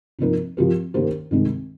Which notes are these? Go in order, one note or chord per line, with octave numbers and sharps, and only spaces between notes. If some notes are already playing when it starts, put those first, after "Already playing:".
C3 F3 A#3 D#4 A#4
F3 C4 G4 A#4
D#3 A#3 C#4 G4 C5
C2 C3 D#3 G#3 D#4